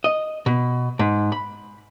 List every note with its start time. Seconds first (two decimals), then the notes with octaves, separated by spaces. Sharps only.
0.04 D#5
0.46 B2
0.99 G#2
1.32 B5